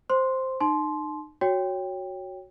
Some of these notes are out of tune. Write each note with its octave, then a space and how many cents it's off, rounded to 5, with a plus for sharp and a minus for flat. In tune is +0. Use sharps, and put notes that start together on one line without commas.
C5 +0 C6 +0
D#4 -35 A5 -40 C6 +0
F#4 +0 C#5 +0 G5 +10